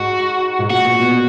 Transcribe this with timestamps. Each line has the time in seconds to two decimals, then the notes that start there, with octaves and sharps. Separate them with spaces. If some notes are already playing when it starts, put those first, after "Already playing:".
Already playing: G#2 F#4
0.59 G#2
0.70 A#2 F#4
0.85 A#2
1.00 B2